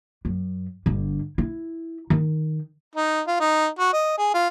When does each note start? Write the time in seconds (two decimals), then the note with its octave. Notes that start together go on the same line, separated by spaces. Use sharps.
0.25 F#2
0.86 G1 D3
1.38 E4
2.10 D#3
2.96 D#4
3.27 F4
3.40 D#4
3.79 F#4
3.93 D#5
4.18 G#4
4.34 F4